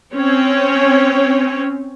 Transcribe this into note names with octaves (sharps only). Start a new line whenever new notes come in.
C4 C#4 C#5